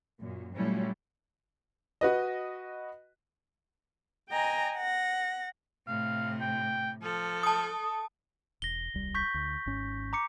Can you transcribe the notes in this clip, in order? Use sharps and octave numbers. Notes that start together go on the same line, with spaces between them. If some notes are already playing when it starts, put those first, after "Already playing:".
F#2 A#2
A#2 F#3 G3 A3 C#4 E4
F#4 B4 D#5
D#5 G5 G#5 A#5
F#5 A#6
A2 C3 F5
G5
F3 A4
A5 D#6
E1 A#6 G7
D#1 C2 G3
C#6 G6 B6
D2
G#1 G#2 C#4
A#5 D6 C#7